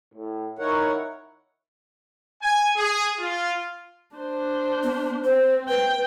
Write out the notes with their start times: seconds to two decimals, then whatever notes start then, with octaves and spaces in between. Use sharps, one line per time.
0.13 A2
0.59 D#3 D#4 E4 A#4 C#5 F#5
2.41 G#5
2.76 G#4
3.19 F4
4.16 D4 C5
4.83 B3
5.24 C4 C5
5.69 B4 G5